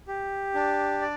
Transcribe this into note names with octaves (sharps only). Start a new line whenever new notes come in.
G4
D4
D5